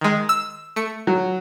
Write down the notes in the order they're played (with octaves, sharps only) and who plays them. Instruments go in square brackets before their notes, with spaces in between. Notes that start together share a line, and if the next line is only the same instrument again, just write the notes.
[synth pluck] D#3 G#3
E6
A3 C#7
[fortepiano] F#3